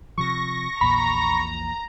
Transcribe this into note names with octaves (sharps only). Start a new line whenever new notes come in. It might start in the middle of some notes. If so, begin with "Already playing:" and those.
C3 F3 C#6 A#6
A#1 E2 A#2 A#5 B5